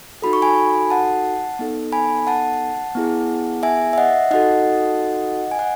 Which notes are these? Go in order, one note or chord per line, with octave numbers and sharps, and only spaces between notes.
D#4 F#4 A4 B5
C#6
G#5 B5
F#5 A5
B3 D#4 A4
G#5 B5
F#5 A5
B3 E4 G#4
E5 G#5
E5
D#5 F#5
D#4 F#4 A4 D#5 F#5
G#5
F#5